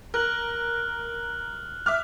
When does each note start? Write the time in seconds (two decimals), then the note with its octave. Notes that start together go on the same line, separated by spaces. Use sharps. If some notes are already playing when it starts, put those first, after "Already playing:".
0.14 A#4 F6 F#6 F#7
1.86 E5 D6 F6